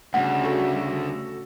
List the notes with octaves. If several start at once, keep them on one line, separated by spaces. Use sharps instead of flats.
D2 C#3 G3 F#5
F#4 A4